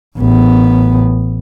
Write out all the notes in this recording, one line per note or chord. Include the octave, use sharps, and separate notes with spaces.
A1 B3